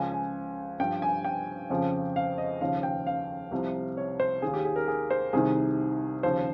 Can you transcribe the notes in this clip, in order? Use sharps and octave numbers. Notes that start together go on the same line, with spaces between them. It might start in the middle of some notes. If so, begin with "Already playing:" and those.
Already playing: C#2 C#3 F3 G#5
G#5
G2 F3 G5
G#5
G5
F2 C#3 F3
F5
D#5
D#2 C#3 F3 F5
G5
F5
C2 C3 F3
C#5
C5
D#2 D#3 G#4
G4
G#4
A#4
G#4
C5
C2 C3 D#3 G#4
D#2 C#3 F3 C5